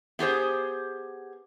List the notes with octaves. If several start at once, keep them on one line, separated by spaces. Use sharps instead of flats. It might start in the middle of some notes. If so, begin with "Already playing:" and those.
B3 G4 G#4 C5